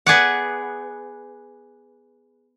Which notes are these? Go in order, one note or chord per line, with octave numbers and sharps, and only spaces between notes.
B3 G#4 D5 F#5